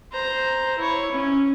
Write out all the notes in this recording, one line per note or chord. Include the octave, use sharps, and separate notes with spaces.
C5 A#5
E4 C#5
C#4